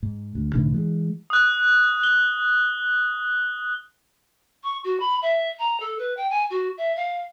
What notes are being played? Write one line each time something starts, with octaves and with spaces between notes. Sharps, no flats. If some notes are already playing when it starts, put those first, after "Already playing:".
G#2
D2
C2 A2 D3 D#3
E3 G3 G#3
D#6 F#6
G7
C#6
F#4
B5
E5
A#5
A4
B4
G5
G#5
F#4
E5
F5